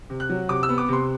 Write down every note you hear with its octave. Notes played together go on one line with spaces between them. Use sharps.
C3
F#6
F#3
C3 D6
E6
B3
D6
C3 C6